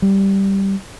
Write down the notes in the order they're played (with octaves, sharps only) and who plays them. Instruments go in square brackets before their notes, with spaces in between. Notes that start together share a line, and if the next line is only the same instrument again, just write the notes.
[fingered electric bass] G3